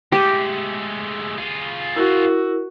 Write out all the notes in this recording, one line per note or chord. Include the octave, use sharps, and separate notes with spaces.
G#3 A3 G4
F4 G#4
E4 F#4 A#4